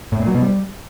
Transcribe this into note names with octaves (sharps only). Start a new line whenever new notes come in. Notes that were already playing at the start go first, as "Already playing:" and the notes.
A2
A#2
F#3
B2
G3